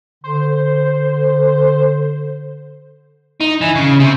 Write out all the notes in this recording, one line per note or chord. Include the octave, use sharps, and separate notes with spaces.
D3 C5
D#4
E3
C#3
C3